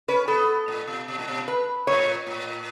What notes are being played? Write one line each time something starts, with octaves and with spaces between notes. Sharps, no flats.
C#4 B4
B3 A4
A2
B2
B2
A2
B2
B4
A2 C#5
A2